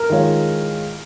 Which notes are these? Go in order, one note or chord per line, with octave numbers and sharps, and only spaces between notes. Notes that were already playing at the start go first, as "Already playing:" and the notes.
Already playing: A#4
D#3 G#3 F4 C#5